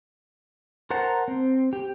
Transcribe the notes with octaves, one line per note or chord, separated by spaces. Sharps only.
A#4 C5 F#5 A5 A#5
C4
G4